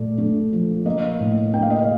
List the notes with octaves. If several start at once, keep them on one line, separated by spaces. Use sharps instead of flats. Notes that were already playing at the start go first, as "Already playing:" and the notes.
Already playing: A#2 A3 D5
A3
F3
A#3 D#5
A2
A#3 G5
F5
D#5
F5